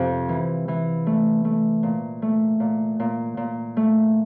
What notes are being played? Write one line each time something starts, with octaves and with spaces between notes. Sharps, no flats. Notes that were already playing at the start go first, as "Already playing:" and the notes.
Already playing: F2 C3
E3
E3
A3
A3
A#2
A3
A#2
A#2
A#2
A3